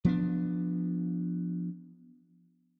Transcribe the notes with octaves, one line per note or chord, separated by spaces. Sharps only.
F3 B3 D4